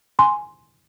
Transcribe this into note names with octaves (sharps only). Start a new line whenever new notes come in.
G#5 C6